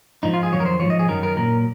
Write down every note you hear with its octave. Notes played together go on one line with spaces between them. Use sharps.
G#2 F3 D#4
F4
G#4
F2 D#3 F#3 C#5
A#4
C5
G#2 F3 C#5
D#5
G#4
F#2 D#3 F#3 A#4
A#4
A#2 F#3 A#4